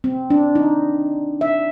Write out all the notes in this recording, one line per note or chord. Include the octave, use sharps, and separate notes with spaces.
C4
D4
D#4
E5